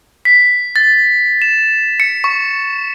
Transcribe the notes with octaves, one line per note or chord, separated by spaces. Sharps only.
B6
A6
E7
C#7
C#6